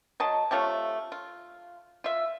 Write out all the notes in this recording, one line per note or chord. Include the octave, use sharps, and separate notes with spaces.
F#3 D#5 A5
C3 A3 F4 C#5
F4
F4 E5